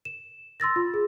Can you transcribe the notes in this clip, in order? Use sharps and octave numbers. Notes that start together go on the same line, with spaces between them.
E7
C6 E6 A6 A#6
F4
G#4